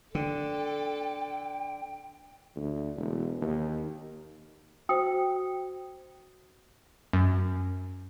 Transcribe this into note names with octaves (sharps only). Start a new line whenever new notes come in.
D3 A4 G5
D2
E1
D#2
F#4 C5 G5 D#6
F#2